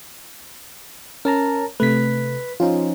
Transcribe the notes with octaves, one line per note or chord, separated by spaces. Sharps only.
C#4 A#4 A5 A#5
C3 A3 B4 B6
F3 C#4 D#4 F4